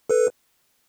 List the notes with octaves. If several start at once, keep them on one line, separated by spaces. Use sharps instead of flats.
A4 B4